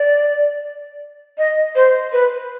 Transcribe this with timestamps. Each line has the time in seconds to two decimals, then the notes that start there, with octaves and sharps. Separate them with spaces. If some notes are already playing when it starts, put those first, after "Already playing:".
Already playing: D5
1.38 D#5
1.75 C5
2.13 B4